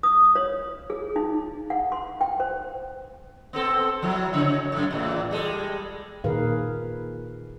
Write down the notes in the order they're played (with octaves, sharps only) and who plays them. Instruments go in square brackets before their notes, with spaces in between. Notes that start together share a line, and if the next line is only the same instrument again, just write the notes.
[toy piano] D#6
C#5
G#4
D#4
F#5
C6
G5
C5
[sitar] B3 C4 A4
F3 F#3 E4
C#3 C#5
F#2 A2
E2 A2 E3
G3 G#3 A4
[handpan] A#2 D#3 G#4 A#4 B4 F5